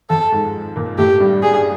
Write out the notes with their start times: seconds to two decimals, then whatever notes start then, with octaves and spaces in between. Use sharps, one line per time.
0.10 F2 F3 A4
0.32 G#2 G#3
0.76 A#2 A#3
0.98 A2 A3 G4
1.20 G2 G3
1.43 G2 G3 G#4